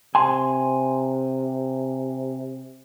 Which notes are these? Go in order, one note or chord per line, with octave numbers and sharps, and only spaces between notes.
C3 G#5 C6